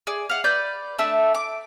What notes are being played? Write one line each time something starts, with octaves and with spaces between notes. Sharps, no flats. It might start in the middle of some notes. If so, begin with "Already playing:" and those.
G#4 D5
F5 F#5
B4 D5 G6
A3 D4 E5 E6
D6